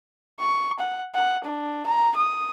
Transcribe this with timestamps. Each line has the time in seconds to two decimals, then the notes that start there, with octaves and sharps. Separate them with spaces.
0.39 C#6
0.79 F#5
1.15 F#5
1.44 D4
1.86 A#5
2.16 D#6